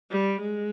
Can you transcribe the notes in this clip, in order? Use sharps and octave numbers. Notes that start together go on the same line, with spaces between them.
G3
G#3